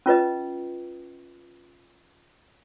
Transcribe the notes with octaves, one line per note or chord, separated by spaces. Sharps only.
C#4 F4 B4 D#5